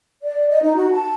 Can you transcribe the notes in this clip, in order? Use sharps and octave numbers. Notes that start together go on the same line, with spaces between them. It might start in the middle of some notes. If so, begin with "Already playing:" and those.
D5
D#5
D#4
F#4
A5